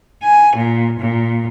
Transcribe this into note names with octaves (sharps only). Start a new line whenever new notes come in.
G#5
A#2
A#2